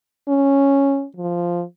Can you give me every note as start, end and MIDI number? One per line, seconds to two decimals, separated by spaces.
0.28 1.05 61
1.17 1.64 53